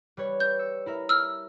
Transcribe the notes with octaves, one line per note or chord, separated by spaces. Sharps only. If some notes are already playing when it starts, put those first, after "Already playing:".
G3 B4 C#5
G6
E6 C#7
E4 A#4 E5
E6 F6